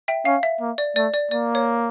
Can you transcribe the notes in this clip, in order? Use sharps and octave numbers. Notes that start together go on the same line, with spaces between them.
E5 G5
C#4 F5
E5
A#3
D5
A3 D5
D5
A#3 D5
C#5